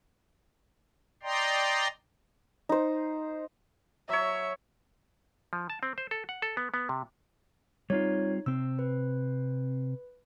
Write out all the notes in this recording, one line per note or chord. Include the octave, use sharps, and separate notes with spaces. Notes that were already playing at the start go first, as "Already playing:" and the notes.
D5 D#5 G5 A#5 C6
D#4 C5
F#3 C#5 E5
F3
A5
C4
C5
A4
F#5
A4
B3
B3
C3
G3 C4 D#4 F4 C#5
C3 C4 E6
B4